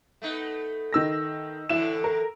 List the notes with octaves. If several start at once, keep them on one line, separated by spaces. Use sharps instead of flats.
A3 B3 D#4
D#3 E6 A#6
A2 D3 E3 E4 E7
A#4